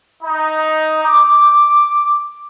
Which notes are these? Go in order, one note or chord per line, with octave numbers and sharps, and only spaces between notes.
D#4
D6